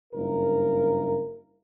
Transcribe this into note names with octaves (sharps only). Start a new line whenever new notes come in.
F#1 G2 A#3 F4 A#4